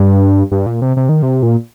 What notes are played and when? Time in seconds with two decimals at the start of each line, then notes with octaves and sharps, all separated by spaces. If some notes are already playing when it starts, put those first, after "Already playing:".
Already playing: G2
0.52 G2
0.66 A#2
0.82 C3
0.97 C3
1.09 D#3
1.23 C3
1.43 A#2